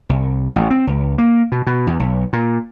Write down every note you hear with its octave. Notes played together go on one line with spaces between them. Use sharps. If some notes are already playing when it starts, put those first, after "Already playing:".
C2
A1
C4
C#2
A#3
B2
B2
E2
B1
A#2